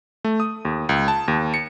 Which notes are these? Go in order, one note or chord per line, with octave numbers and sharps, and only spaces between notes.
A3
D#6
D#2
C#2
A5
D#2
C#7